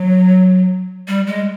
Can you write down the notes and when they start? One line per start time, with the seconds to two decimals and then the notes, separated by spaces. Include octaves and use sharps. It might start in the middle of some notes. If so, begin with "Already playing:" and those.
Already playing: F#3
1.08 G3
1.27 G#3